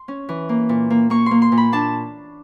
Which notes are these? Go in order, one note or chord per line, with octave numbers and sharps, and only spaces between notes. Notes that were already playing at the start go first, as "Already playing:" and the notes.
Already playing: C6
C#4
E3
A#3
A#2
A#3
A#3 C#6
A#3 C6
C6
A#2
B5
D4 A5